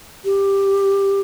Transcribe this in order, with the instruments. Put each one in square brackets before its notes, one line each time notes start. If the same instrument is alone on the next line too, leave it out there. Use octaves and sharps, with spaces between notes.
[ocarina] G4